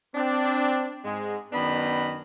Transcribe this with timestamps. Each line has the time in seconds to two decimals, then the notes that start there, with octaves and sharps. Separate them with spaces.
0.15 C4 D4
1.05 G#2 G#3
1.53 F#2 D#3 B3 D4 D#5 B5